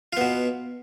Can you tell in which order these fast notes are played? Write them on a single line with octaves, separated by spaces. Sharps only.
F4 B3 B2